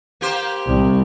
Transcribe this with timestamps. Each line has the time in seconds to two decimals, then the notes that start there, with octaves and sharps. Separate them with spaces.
0.21 A#3 G4 C5
0.66 C2